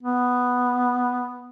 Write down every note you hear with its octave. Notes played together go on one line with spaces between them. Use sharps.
B3